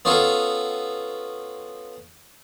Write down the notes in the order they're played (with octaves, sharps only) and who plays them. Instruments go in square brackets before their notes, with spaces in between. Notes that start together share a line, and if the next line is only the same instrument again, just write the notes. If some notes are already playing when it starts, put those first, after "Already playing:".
[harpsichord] B3 C#4 F4 G#4 A4